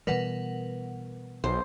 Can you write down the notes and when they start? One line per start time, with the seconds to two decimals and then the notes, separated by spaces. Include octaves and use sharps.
0.07 B2 E3 G3 A#4 B4 F#5
1.44 B1 C5